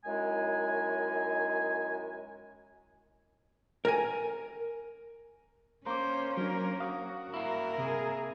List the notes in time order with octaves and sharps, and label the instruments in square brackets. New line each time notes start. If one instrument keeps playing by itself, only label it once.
[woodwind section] F#2 D#3 G#3 E4 G#5
[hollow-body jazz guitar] A#4 G#5
[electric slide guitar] A#3 [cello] C#4 [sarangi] C5 [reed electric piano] A#5 C#6 D6
[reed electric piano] F#3 D4 [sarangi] A#4
[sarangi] F#4 [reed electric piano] F5 D#6
[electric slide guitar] A#3 E4 [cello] A#4
[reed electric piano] C3 [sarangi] G#4